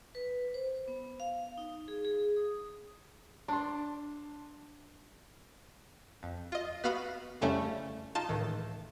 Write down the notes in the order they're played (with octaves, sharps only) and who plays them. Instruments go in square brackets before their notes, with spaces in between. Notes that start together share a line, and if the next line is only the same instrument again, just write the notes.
[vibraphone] B4
C5
B3
F5
D#4
G#4
G#4
D#6
[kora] D4 [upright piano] A5 C6
[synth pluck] F2
F4 D#5
B3 F#4 F5 B5
F2 C#3 G3 A3 C#4 E4
D#4 F4 A5
C#2 A2 D#3 E3